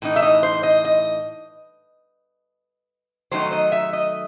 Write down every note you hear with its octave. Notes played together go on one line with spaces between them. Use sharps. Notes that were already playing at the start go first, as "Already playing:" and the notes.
A2 E3 D#4
E5
D#5
C5
D#5
D#5
D#3 F#3 A3 D#4 C5
D#5
E5
D#5